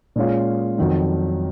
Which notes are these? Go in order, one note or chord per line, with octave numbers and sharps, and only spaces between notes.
A#2 G#3 C#4 F4
F2 D#3 F#3